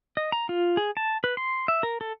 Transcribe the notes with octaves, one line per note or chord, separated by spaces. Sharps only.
D#5
A#5
F4
G#4
A5
B4
C6
E5
A#4
A4